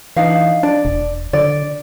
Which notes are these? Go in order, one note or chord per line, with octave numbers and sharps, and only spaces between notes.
E3 D4 D#4 F5
D4 D5
E1
D3 D5